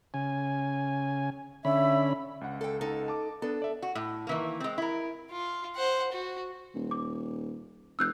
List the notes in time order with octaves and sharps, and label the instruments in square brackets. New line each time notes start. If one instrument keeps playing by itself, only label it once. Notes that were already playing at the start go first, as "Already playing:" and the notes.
[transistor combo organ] C#3 G#5
[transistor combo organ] D3 C#4 B5 [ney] E5
[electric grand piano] C#2 F#5
[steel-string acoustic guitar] A4 G5
D#4 A4
[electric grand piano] A5 D6
[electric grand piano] B3 D4 [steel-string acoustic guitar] A4
[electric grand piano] D5 E5
[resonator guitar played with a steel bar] F#4
A2
D#3 E3 A#3
G#3 C4
E4 A#4
[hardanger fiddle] F4
C5 F#5
F#4
[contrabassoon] D#1
[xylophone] D6
[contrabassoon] F1 [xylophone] E6 F#6 G6